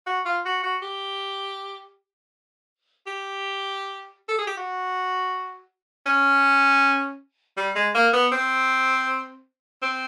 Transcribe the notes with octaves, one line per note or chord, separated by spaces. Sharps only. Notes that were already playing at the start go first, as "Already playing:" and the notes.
F#4
F4
F#4
F#4
G4
G4
A4
G#4
G4
F#4
C#4
G3
G#3
A#3
B3
C4
C4